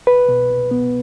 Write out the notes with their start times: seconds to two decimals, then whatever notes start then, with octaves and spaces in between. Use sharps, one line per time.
0.07 C2 B4
0.28 B2
0.50 C2
0.71 B3